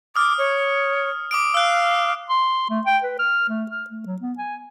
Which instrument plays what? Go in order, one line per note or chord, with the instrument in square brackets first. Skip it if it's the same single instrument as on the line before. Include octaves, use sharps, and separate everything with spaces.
[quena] D6 [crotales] D#6 F6
[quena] C#5
[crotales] D6 D#6 D7
[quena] F5 [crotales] E6 F#6
[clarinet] C6
A3
G5
B4
F6
A3
F6
A3
F#3
B3
G#5